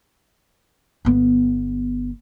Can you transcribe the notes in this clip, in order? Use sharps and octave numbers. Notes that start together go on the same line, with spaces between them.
G1 B3